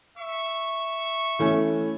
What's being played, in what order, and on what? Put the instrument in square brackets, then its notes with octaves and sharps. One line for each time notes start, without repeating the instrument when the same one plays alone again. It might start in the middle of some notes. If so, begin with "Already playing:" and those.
[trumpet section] E5 C#6
[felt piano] E3 A3 C#4